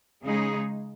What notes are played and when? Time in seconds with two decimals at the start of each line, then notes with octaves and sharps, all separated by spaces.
0.23 C#3 G#3 D#4 G#4